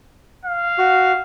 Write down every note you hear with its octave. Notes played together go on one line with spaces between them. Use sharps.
F5
F#4